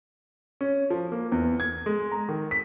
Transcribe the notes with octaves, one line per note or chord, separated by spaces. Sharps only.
C#4
F3
A#3
E2
G#6
G#3
A#5
D#3
B6